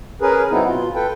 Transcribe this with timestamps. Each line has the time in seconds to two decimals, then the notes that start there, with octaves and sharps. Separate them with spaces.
0.22 C#4 G#4 A#4 B4
0.51 F#3 B3 C4 D#4 E4
0.65 B2 F4
0.95 A4 B4 G5